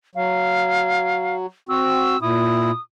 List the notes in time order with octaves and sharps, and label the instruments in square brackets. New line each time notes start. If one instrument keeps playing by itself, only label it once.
[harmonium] F#3 [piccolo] F5
[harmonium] C4 F#4 [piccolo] E6
[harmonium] A#2 E4 [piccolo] D#6